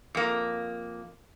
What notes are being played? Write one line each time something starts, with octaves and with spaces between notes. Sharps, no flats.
F2 A#3